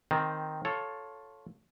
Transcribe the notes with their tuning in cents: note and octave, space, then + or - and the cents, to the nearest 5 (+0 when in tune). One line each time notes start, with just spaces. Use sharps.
D#3 +0 C4 +0
F4 +15 A4 +0 C#5 +0